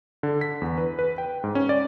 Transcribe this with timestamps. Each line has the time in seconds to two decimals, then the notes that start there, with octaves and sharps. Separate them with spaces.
0.23 D3
0.41 B6
0.62 E2
0.78 B4
0.99 B4
1.18 G5
1.44 G#2
1.55 C#4
1.69 D5